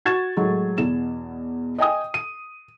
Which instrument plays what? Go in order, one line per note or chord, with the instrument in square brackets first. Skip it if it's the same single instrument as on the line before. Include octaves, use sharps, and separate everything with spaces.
[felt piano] F#4 G#6 A6 E7
A2 F#3 G#3 A3
E2 B2 E7
D#5 G5 G#5 D#6
D#7